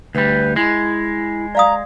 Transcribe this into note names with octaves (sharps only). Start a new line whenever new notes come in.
D2 G3 B4
G#3 E4
D5 F5 A#5 D#6